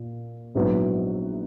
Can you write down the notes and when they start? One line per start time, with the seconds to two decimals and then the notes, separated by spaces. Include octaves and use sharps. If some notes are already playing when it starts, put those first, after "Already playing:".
Already playing: A#2
0.55 A#1 G#2 F#3 B3 E4